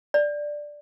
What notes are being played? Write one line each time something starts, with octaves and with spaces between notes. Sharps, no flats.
D5